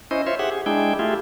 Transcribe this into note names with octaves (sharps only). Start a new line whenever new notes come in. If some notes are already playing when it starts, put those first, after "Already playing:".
C#4 E4 C5 D#5
F4 C5 C#5 E5
G4 G#4 E5 F#5
G#4
G#3 D4 E4 G#4 G5
A3 E4 F4 G4 G#4